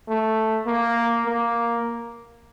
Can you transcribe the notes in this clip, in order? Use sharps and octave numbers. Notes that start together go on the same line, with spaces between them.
A3
A#3
A#3